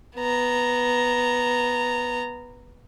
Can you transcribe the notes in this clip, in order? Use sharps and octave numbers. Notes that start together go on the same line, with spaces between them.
B3 A#5